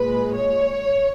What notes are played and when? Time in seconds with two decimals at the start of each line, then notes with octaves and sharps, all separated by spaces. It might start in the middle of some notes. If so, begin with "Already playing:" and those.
Already playing: A#2 G#3 B4
0.35 C#5